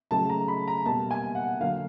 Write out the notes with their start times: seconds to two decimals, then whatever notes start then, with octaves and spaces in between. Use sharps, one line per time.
0.11 C#3 F#3 A3 A5
0.29 A#5
0.48 B5
0.68 A#5
0.86 B2 G3 A#3 A5
1.11 G#5
1.35 F#5
1.60 D3 F#3 A#3 F5